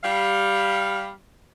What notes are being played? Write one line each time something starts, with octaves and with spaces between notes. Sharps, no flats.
G3 F5